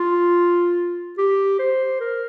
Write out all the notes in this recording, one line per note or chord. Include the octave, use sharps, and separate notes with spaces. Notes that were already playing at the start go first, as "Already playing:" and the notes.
Already playing: F4
G4
C5
A#4